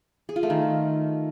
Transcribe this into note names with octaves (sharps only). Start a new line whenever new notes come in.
G#4
F4
A3
D#3